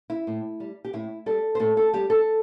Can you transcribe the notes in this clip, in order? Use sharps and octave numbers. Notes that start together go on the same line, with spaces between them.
E4
A2
G3
G4
A2 E4
G3 A4
C5
A2 A4
A4
G3 G4
A4